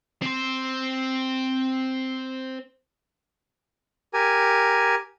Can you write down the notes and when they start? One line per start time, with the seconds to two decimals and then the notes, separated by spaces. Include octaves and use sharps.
0.22 C4 C5
4.14 G4 A#4 G#5